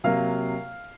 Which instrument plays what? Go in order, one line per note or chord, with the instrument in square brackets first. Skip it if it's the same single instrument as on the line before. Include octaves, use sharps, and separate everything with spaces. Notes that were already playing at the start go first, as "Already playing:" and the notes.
[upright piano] C3 F#3 A#3 F5